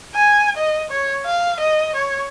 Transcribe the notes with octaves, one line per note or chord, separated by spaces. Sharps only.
G#5
D#5
C#5
F5
D#5
C#5